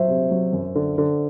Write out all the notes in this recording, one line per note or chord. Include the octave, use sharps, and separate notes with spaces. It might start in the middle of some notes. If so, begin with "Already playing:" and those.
Already playing: F#3 C5 E5
C3
F#3
F#2
D3
D3